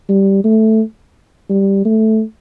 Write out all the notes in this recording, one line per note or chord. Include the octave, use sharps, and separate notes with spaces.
G3
A3
G3
A3